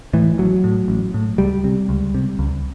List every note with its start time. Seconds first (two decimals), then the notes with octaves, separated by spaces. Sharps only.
0.13 A2 E3
0.38 A1 F#3
0.64 A2
0.88 A1
1.14 A2
1.38 C#2 G3
1.64 C3
1.89 C#2
2.15 C3
2.39 C#2